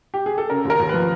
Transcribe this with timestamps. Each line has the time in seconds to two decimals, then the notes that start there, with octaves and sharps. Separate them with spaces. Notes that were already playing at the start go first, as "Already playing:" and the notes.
0.14 G4
0.26 G#4
0.38 A4
0.50 C#3 A#4
0.65 D#2 A#4
0.80 D#2
0.89 F3 B4